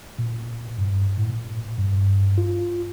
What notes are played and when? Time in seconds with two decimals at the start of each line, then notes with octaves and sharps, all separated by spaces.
0.18 A#2
0.78 G2
1.18 A2
1.30 A#2
1.79 G2
2.38 F4